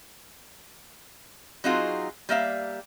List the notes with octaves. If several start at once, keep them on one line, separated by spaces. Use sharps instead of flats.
F#3 C4 D#4 F4 F#4 G#4
G3 A#3 E5 F5